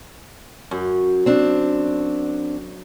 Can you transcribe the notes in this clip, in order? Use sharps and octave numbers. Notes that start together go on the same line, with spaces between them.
F#2
C4 D4